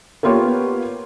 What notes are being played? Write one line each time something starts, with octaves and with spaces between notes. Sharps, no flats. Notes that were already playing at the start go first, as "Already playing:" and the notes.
A#3 B3 F4 G4 B4 C#5